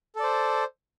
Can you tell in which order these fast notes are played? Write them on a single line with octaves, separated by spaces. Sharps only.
A4 D5 C5